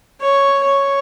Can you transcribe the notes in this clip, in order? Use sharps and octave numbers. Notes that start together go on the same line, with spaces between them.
C#5
C#5